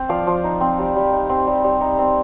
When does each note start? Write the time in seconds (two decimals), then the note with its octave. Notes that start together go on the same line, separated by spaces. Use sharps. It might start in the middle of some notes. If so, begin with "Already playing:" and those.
Already playing: C4 C5
0.09 F3 D5 F5
0.27 F3
0.44 D#4
0.61 C4
0.79 G3
0.96 G3
1.12 D#4
1.29 C4
1.47 G3
1.64 G3
1.81 D#4
1.98 C4